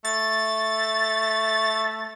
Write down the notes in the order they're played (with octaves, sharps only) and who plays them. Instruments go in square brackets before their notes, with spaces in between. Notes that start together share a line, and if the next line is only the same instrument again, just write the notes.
[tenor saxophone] A3 [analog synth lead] A6